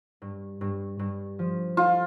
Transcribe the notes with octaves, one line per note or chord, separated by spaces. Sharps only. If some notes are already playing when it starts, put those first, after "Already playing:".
G2
G2
G2
F3
F4 A4